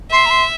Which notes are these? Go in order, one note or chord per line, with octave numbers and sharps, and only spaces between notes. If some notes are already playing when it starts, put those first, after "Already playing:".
E5 C6
A#5
C6